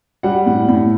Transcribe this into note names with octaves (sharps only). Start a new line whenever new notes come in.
G3 F#5
A2
A2